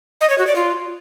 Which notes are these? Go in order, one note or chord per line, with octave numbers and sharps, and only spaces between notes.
D#5
C#5
F#4
D5
F4